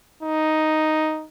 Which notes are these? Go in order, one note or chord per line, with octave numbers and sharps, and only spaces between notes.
D#4